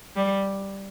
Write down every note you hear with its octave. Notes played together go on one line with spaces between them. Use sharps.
G3